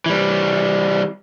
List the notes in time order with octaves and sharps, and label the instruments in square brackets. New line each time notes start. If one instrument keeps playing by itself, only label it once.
[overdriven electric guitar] E3 G3